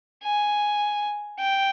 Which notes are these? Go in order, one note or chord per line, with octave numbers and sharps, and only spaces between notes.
G#5
G5